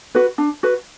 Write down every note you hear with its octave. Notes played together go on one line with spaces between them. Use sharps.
F#4 B4
D4
F#4 B4